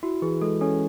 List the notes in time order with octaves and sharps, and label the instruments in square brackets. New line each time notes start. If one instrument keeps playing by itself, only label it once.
[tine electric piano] E4 [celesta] F#4
[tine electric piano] E3 [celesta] G#4
[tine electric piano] G#3 [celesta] A4
[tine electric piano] C#4 [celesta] A4